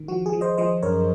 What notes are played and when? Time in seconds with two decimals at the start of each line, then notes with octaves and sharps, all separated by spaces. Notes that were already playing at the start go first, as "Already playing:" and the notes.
Already playing: D#3
0.08 F3 F#4
0.26 G#4
0.33 F3
0.41 C5 D#5
0.58 F3 C5 D#5
0.83 F#2 A#4 C#5